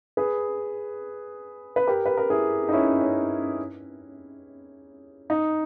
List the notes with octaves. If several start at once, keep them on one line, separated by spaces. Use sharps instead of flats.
G#4 B4
B4
G4 A#4
B4
A#4
E4 G#4
D#4
C#4 E4
C#4
D#4